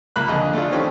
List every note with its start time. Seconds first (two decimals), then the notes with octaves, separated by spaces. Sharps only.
0.16 C#2 A#3 B5 F#6
0.28 F2 D3 G#4 D#5
0.53 A3 D4 E4 F4
0.71 D#3 F3 C4 C#4 G4